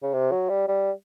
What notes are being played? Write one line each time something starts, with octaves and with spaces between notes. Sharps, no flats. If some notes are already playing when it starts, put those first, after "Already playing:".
C#3
C3
F#3
G3
G3